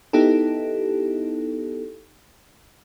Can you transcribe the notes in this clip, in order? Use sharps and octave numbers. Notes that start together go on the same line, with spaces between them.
B3 D#4 E4 G4 A4